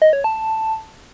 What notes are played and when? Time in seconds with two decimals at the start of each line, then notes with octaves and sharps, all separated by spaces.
0.02 D#5
0.13 C#5
0.24 A5